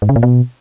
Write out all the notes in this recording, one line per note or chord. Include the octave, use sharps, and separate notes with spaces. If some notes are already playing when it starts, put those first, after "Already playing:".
G#2
C#3
A#2
B2